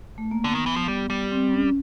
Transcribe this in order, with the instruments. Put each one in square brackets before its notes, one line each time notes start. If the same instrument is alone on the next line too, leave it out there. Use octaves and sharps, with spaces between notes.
[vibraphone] A3
A#3
[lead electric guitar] D3 [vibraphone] B3
[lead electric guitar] D#3
E3
F3
G3
G3
[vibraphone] C4
C#4